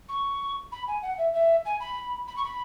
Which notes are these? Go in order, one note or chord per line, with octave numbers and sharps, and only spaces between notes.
C#6
B5
G#5
F#5
E5
E5
G#5
B5
B5
C#6
B5